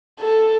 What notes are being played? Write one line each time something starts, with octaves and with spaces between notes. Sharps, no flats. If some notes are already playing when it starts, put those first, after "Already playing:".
A4